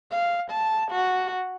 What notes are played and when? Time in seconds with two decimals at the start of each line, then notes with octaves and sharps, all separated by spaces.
0.11 F5
0.51 A5
0.91 F#4